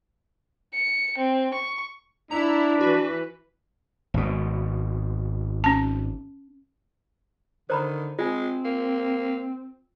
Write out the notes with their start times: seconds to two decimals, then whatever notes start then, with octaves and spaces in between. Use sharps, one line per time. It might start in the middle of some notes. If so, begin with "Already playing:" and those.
0.74 C#7
1.18 C4
1.54 C#6
2.31 D4 E4 A#5
2.81 E3 F#4 B4
4.14 G#1 B2
5.64 C#4 A5
7.70 D3 D#3 C5 A#5 B5
8.19 G#3 C4 F4 G#5
8.65 A#3